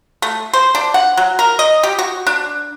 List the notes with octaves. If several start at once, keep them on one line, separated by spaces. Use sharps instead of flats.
A3
C5
D4
F#5
F#3
A#4
D#5
G4
F#4
D4